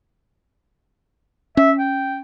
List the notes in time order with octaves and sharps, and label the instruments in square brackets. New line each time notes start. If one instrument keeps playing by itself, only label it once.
[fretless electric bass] C#4 [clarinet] E5
[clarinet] G5